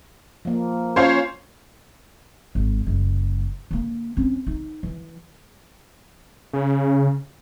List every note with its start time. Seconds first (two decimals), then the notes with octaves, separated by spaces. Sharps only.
0.45 F3 A#3
0.96 C#4 F4 C5 C#5 F5
2.55 G#1
2.87 F#1 G3
3.71 D3 A#3
4.17 C4 C#4
4.47 D#4
4.83 E3
6.53 C#3